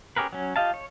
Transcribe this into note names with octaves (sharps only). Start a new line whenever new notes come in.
C#4 G4 G#4 A#4 B4
F#3 C#4
F4 G4 D#5 F5 A5
C#5